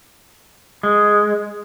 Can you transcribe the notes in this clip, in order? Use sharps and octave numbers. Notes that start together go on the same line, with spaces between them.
G#3